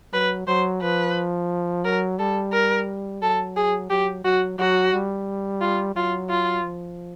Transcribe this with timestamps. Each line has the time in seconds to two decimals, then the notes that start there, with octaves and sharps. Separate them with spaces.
0.13 F#3 B4
0.47 F#3 C5
0.82 F3 B4
1.84 F#3 A#4
2.19 G3 A4
2.53 A#4
3.22 F#3 A4
3.56 G#4
3.90 F#3 G4
4.24 F#3 F#4
4.59 F#3 F#4
4.93 G3
5.61 F4
5.95 F#3 F4
6.30 F4
6.64 F3